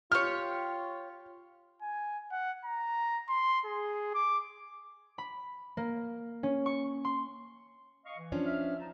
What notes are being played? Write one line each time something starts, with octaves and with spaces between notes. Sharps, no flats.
F4 G4 C#5 F6
G#5
F#5
A#5
C6
G#4
D6
B5
A#3
C#4
C#6
C6
D#5 F5 C#6
E3
F3 C#4 D4
E5 F6
D#4 A5